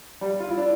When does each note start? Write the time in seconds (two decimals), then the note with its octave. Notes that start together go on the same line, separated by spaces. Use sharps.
0.21 G3
0.40 F4
0.48 E4
0.57 D4